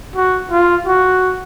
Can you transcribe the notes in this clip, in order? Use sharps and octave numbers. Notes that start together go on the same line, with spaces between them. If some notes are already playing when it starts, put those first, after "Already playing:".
F#4
F4
F#4